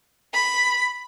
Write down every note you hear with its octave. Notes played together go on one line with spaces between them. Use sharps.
B5